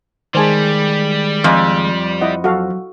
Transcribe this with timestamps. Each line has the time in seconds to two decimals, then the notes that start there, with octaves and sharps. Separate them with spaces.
0.35 D#3 G3 G#3 G#4 C5 G#5 A5
1.44 F2 D#5 G#5 D#6
2.21 E4 D#5 F#5
2.44 F#3 F#4 A4 F5